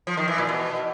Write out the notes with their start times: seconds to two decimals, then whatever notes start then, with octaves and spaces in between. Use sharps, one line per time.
0.07 F3
0.17 D#3
0.28 E3
0.38 A#2
0.48 B2